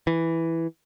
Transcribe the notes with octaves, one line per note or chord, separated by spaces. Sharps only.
E3